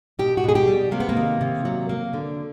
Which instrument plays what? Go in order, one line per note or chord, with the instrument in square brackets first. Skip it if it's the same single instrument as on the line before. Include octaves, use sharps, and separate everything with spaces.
[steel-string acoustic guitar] B2 G4
F#4
B2 G#4
G4
G3
C3 A#3
B3
A#3
D#3
C3
F#3
A#3
D3